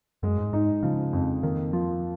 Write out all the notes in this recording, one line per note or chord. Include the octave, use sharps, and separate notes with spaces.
F#2 G#3
G#2
G#2 D#4
C#3 F3
F2
D#3 A#3
F3 F4